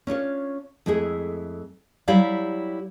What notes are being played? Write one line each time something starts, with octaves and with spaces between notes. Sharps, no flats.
C#4 D4 F4 C#5
F2 G#3 A3 E4 G#4
F#3 G3 E4 G4 D5 F5